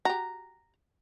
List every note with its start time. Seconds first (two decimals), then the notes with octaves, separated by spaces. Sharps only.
0.05 F#4 G4 A#5